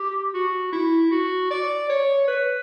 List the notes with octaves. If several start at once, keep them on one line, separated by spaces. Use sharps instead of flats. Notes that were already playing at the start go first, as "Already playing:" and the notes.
Already playing: G4
F#4
E4
F#4
D5
C#5
B4